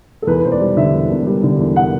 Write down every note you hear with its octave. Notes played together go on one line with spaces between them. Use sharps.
A4
E2 B4
B4
E1 C5
D5
G3
D3 E5
E2
E1
G3
D3
E2
F#5